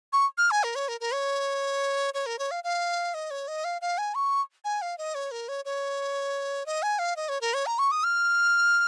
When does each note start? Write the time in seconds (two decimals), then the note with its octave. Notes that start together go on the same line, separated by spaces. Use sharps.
0.13 C#6
0.38 F6
0.51 G#5
0.63 A#4
0.75 C#5
0.88 A#4
1.00 A#4
1.13 C#5
2.14 C#5
2.26 A#4
2.39 C#5
2.51 F5
2.64 F5
3.14 D#5
3.31 C#5
3.48 D#5
3.64 F5
3.81 F5
3.98 G#5
4.15 C#6
4.64 G#5
4.82 F5
4.98 D#5
5.15 C#5
5.31 A#4
5.48 C#5
5.65 C#5
6.66 D#5
6.82 G#5
6.99 F5
7.16 D#5
7.29 C#5
7.41 A#4
7.54 C#5
7.66 A#5
7.79 C#6
7.91 D#6
8.04 F6